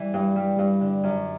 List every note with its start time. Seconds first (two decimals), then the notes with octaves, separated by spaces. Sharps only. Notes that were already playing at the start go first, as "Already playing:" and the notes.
Already playing: E3 G3
0.14 G2
0.36 G3
0.59 G2
0.81 D3
1.03 F#2